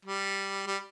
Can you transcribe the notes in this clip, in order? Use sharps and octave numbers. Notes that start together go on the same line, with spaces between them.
G3
G3